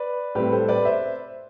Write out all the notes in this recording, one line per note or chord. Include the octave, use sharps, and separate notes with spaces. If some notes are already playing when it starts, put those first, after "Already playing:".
Already playing: B4 D5
A2 G3 C4 G4 B4
A4 C5
B4 D5
C5 E5